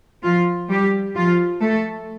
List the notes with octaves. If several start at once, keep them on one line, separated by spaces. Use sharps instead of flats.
F3 F4
G3 G4
F3 F4
A3 A4